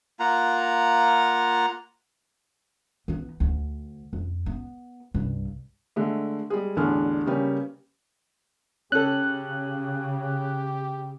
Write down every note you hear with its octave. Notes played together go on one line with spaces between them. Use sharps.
A#3 F4 F#5 A#5
E3 B3
D2
F2
B3
C2 G2
D3 G#3 A3
G3 G#3 G#4
A1 E2 D3 D4 G#4 F6
C#3 G3 A#3 C#4 G4 B4
C#3 C#4 G4 A4 F#6